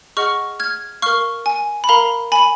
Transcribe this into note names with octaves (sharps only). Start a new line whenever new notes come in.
G#4 D#5 F#5 C#6 F6
F6 G#6
A#4 F5 C#6 F6
G#5
B5
A#4 F5 A#5
G#5 B5